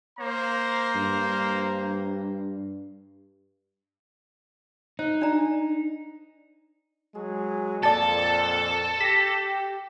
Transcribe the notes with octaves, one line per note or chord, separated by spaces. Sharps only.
A#3 C5 A#5
G2
D#4 C5
D4 D5 A#5
F#3 G#3 G#4
F2 A#2 A4 D5 A5
G4 A#6 B6